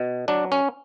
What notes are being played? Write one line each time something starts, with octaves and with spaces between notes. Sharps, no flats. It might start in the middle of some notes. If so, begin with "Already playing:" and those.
Already playing: B2
F#3 D4
C#4